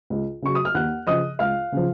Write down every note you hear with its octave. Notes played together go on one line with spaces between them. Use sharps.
C#2
C#3 F#3 C#6
D#6
F6
D#2 F#5 F#6
C#3 F3 D#5 D#6
C#2 F5 F6
C#3 F3